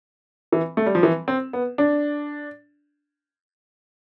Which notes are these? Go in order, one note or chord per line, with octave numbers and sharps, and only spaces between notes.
E3
A3
G3
F3
E3
C4
B3
D4